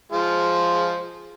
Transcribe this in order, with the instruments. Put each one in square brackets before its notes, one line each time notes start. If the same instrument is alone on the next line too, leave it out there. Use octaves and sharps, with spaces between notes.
[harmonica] F3 G#3 F4